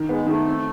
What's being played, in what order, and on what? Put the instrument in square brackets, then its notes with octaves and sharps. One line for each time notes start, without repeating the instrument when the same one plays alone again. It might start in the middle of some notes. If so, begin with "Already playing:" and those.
Already playing: [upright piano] D#3
[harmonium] G#3 [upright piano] B3
[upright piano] D#3 [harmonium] A3
[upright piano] C4